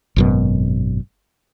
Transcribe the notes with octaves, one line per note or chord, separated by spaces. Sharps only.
G#1 F#2 B2